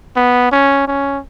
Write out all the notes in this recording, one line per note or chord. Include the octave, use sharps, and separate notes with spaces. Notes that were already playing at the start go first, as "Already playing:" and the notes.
B3
C#4
C#4